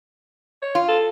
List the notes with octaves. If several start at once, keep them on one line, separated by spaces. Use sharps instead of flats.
C#5
F4
A4